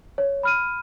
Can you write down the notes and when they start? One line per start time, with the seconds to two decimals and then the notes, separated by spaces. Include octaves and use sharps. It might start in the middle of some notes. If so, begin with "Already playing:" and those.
0.18 C#5
0.43 B5 F6 D#7